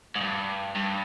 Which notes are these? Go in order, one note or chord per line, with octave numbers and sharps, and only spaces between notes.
G#2
G2
G2